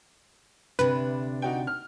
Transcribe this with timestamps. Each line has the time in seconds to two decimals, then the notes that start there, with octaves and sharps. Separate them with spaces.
0.79 D2 C3 D4 B4
1.42 D#4 F#4 G5
1.67 F6